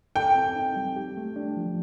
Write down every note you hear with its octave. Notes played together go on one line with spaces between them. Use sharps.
A4 G5
C4
D#4
G3
G4
A3
D4
F3